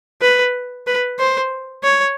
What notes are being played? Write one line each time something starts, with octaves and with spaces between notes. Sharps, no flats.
B4
B4
C5
C#5